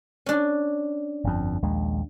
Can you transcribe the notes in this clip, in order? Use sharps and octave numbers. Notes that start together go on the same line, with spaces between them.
C#4 D4
G1 F2
A#1 D#2 G#3